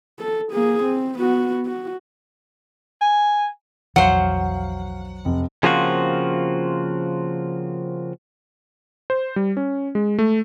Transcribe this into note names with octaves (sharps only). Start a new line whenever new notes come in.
A4
A#3 G#4
C4
B3 F#4
F#4
G#5
B1 F2 E3 F#3 C5 F5 F#5
F1
C#3 F3 A#3 C4 F4 F#4
C5
G3
C#4
G#3
A3